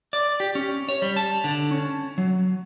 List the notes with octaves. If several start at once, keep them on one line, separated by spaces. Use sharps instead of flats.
D5
G4
C#4
C#5
G3
A5
D3
C#4
F#3